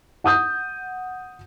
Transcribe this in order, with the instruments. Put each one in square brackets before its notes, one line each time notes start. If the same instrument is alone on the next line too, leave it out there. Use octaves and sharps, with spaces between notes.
[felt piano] F#5 D#6 G6